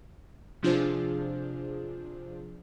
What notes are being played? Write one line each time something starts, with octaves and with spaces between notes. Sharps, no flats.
C3 F3 D4 F4 G#4 C5